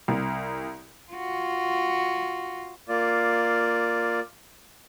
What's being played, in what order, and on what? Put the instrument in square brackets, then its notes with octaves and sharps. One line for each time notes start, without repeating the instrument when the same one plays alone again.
[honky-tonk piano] C2
[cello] F4 F#4
[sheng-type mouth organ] A#3 F4 D5